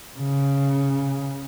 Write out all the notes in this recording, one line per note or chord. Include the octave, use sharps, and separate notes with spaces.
C#3